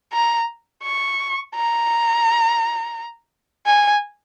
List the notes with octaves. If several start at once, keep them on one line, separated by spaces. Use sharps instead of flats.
A#5
C#6
A#5
G#5